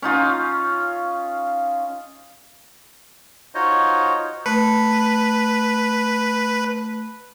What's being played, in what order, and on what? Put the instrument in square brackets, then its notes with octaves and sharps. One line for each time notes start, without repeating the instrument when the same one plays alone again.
[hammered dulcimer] C#4 D#4 F4
[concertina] D#4 F4 F#4 C5 C#5 D#5
[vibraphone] A3 [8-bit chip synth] B4